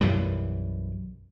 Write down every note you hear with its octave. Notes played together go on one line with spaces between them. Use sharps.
B1 F#2 E3 G3